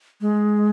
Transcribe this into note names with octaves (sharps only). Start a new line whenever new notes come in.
G#3